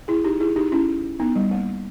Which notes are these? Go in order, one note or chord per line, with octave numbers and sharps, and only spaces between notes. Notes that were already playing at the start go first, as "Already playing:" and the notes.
E4 G#4
D#4 G4
E4 G#4
D#4 G4
C#4 E4
B3 D#4
G3
A#3